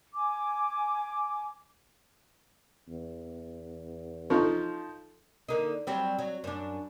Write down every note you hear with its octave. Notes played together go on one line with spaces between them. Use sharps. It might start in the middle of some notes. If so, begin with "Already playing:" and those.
G#5 D6
E2
F3 D#4 A4 C#6
D3 A#3 D#4
F#3 G3 C4
F#3
F#2 D4